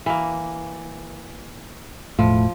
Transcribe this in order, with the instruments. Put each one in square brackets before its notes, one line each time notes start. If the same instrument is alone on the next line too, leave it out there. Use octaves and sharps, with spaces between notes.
[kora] E3 A#3
[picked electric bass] E1 A2 [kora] F3